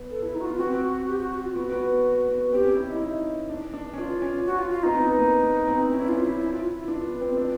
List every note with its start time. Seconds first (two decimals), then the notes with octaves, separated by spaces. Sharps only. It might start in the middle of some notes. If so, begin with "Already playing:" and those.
Already playing: B3
0.11 A4
0.23 E4
0.35 D#4
0.41 F#4
0.46 B3 F4
0.58 C4 F#4
1.08 G4
1.19 F#4
1.31 F#4
1.44 F4
1.55 B3 F#4
1.72 B3
2.28 B3
2.53 C4 G4
2.65 C#4
2.77 E4
2.89 D#4
2.96 E4
3.04 D#4
3.50 D4
3.74 D4
3.93 C#4
3.97 D4 F4
4.22 C#4
4.46 F#4
4.58 F4
4.71 F4
4.83 C4 D#4
4.95 B3
5.19 A#3
5.43 B3
5.67 C4
5.91 C#4 E4
6.01 D4
6.08 C#4 F4
6.23 E4
6.40 E4
6.52 F4
6.64 E4
6.77 E4
6.88 D4 F4
7.05 B3
7.21 C4
7.37 D4